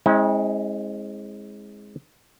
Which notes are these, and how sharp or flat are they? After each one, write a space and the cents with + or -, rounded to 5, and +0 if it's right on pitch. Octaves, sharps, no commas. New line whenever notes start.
G#3 -5 C4 +35 E4 -45